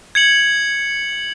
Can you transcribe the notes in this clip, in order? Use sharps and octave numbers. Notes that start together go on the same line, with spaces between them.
G#6 C#7 F#7